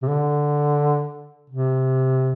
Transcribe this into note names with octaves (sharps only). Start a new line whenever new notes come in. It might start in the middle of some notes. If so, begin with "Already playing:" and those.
C3
D3
C3